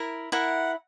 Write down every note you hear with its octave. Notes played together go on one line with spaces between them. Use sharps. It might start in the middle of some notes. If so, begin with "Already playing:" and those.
Already playing: E4 A#4 E5
E4 A#4 E5 F#5